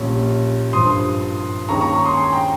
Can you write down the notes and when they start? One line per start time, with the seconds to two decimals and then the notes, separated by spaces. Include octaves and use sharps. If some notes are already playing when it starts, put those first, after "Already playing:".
Already playing: A#1 A#2 G3 C#4
0.73 G#1 G2 F3 C6 D#6
1.69 D#2 D#3 G#3 C#4 A#5 C#6
1.81 A#5 C#6
1.93 A#5 C#6
2.04 C6 D#6
2.17 G#5 C6
2.33 G5 A#5